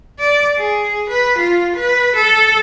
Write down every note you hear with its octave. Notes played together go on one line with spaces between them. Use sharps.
D5
G#4
B4
F4
B4
A4